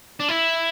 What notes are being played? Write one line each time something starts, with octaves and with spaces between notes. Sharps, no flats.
D4
E4